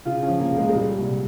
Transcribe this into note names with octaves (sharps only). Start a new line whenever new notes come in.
C#3 F4
C#4
F3
A#3
C#2
G#3
G#3
A#2 G3
C2